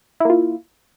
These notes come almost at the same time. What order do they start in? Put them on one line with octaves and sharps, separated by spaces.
E4 A#3 F4